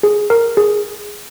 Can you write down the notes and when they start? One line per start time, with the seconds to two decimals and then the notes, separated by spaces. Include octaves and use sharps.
0.03 G#4
0.30 A#4
0.57 G#4